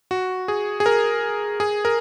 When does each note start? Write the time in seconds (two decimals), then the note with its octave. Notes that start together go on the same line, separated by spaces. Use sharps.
0.11 F#4
0.48 G#4
0.80 G#4
0.86 A#4
1.60 G#4
1.85 A#4